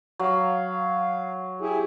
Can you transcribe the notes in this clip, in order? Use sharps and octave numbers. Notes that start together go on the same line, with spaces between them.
F#3 F5
E4 G4 G#4